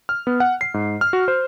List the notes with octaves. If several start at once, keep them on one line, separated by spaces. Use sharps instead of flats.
F6
B3
F#5
C7
G#2
F6
F#4
C5